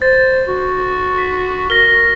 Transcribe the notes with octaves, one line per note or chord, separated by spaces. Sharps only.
C5 A6
F#4
B6
A#4 A#6 G7